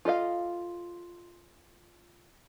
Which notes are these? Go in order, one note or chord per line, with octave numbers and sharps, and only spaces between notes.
F4 A4 D#5 F5